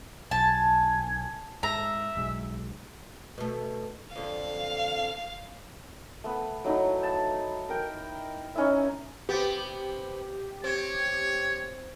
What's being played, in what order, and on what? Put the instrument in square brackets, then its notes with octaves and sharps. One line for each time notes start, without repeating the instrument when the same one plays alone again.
[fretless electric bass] B1 [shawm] G#5 [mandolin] A5
[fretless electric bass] G#2 [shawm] E5 [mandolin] A#5
[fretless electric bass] B1 G#3
[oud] B2 A3
[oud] F2 D3 [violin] F5
[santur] A3 B3
F#3 A3 D#4 E4
A5
A#4 G5
C#4 D#4 E4 E5
[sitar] B3 C4 [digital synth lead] G4
[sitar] C4 [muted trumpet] C#5